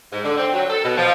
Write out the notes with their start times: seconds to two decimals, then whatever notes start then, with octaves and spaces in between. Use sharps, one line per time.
0.12 G#2
0.24 D3
0.38 C4
0.53 F#3
0.69 A4
0.84 B2
0.97 F3